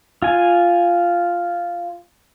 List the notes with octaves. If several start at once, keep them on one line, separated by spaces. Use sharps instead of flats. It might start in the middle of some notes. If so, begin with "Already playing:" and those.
F4 G#5